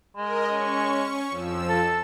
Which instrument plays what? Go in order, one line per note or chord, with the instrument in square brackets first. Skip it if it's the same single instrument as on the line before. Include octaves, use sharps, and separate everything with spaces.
[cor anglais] G#3 [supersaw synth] A#4 D#5
[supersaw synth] C#4 C#6
F2 F3 E6
[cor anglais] A4